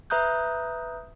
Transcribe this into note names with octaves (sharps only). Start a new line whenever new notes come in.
B4 E5 A#5 D#6 F#6 G6